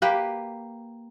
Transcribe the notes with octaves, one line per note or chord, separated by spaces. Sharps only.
A#3 G4 B4